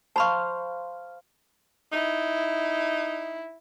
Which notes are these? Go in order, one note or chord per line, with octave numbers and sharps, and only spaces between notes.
C5 F5 A5 B5 C#6
D#4 E4